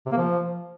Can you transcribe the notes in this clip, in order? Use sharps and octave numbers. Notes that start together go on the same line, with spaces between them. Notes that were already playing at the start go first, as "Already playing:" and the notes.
C3
A#3
F3